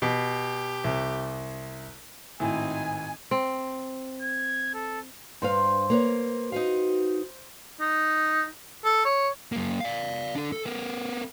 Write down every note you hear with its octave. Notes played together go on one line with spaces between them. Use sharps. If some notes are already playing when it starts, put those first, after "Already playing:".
B2 G4
C2
G#1 A2 C4 D#4 G#5
C4
G#6
A4
G2 B4 C5 F5
A#3 B4 C#5
D#4 F#4 B4 F5
D#4
A4
C#5
F#2 A#3
D5 F5
D4 A4
A4
B3 A#4